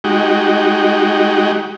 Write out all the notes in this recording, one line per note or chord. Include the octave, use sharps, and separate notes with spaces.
G#3 D#4 F#4 G4